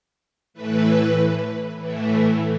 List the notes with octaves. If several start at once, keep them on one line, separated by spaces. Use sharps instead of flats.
A2 E3 A3 B4
A2 E3 A3